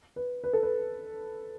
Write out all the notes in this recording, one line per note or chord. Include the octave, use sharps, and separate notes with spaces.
B4
B4
A4
B4